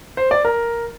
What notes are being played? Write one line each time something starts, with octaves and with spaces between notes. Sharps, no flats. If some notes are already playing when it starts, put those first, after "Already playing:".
C5
D5
A#4